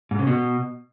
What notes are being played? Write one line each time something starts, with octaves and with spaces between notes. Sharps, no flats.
G#2
C#3
B2